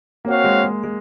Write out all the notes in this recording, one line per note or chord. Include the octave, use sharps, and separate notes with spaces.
A#3 C4 F#4 C#5 F5
G#3
G#3
G#3